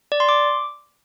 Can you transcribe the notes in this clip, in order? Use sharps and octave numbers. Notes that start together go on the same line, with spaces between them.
D5
C6
D6